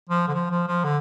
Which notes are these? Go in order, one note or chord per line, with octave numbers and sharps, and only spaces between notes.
F3
D3
F3
F3
F3
D3